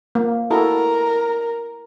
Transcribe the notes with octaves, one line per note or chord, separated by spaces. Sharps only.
A#3
E4 F#4 A4 A#4